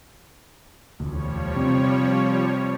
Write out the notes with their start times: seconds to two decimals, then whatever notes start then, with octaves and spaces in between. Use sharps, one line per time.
1.00 E1 D2 F3 G3 C#5
1.56 C3 C4